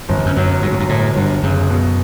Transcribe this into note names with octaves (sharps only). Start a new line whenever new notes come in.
G1 F#2
E2
F#2
F#2 F#3
G2 F#3
A2
G2
G1 A2
G1 G2
F#2 C#3
B2